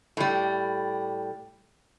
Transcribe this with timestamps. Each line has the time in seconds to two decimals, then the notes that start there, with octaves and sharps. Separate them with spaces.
0.17 A2 G3